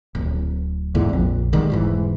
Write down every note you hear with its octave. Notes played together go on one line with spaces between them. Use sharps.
D1
E2 G#2 D3
A#1 F2
D3 D#3 G3 G#3
E1 G#2 E3